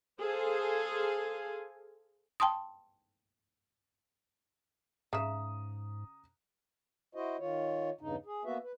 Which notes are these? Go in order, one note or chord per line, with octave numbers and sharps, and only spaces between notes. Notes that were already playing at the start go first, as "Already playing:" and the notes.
G#4 A4 C5 F5 G#5
G5 A5 C6 D#6
G#2 C#3 E5 A#5 D#6
E4 F#4 C5 D#5
D#3 F4 C#5
E2 G2 C#3 D#4
G#4
A#3 B3 F#4 B4 E5
B4